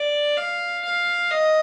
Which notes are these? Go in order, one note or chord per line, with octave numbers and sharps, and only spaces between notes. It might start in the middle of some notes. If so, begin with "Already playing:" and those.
Already playing: D5
F5
F5
D#5